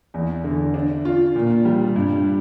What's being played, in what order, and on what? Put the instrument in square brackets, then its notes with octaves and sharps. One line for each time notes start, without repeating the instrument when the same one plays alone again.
[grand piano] E2
D3
D4
F4
A#2
G3
G2